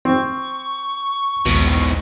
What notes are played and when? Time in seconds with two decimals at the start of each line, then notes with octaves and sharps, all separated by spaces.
0.05 C4 C#6
1.46 A#1 D#2 G#2 B2